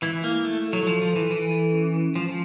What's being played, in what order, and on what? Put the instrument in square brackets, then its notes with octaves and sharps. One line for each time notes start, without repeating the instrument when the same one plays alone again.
[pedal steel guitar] E3 E4 [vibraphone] G#3
[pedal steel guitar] A#3 [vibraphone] E4
[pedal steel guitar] A3 [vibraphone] E4
[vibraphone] A4
[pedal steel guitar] F#3
F#3
[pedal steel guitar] F3 [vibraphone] A4
[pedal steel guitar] F3
[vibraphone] A4
[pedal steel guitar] E3
[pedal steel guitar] E3 [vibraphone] A4
[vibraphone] A4
C#4
C#4
[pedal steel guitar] F3 [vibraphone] G#3
[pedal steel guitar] F3